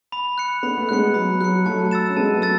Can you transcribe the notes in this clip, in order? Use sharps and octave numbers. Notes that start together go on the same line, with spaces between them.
B5
F#6 C#7
B3 B5
A3
G#3 B3 F#6 C#7
F#3 B5
F#3 F#6 C#7
F#3 A3 A5
E6 A6 E7
C#4
G#3 B3 A5
F#3 A3
E6 A6